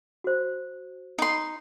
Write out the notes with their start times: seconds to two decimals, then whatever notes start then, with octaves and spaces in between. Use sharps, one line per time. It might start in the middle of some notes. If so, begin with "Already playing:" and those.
0.24 F#4 C5
1.18 D#4 C6